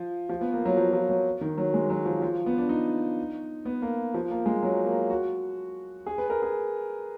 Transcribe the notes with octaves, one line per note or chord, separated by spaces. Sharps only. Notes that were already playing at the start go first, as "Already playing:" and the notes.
Already playing: F3
F3
B3
A#3
F#3
F3
F3
F#3
D#3
F#3
G#3
F#3
F3
F3
B3
D4
D#4
B3
A#3
F3
A#3
G#3
F#3
A#3
F#4
G#4
B4
A#4
G#4